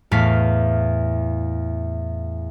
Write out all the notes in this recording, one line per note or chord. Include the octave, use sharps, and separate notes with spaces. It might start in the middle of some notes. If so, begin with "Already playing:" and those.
E2 A2 A3 F5 B6